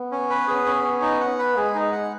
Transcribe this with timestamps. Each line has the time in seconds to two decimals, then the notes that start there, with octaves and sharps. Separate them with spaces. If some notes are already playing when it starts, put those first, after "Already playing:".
Already playing: B3
0.12 C#4
0.30 B4
0.47 B3 G#4
0.66 C#4
0.84 C#4
1.02 D#4
1.20 F#5
1.39 B4
1.56 G#3 G#4
1.74 D#4
1.92 F#5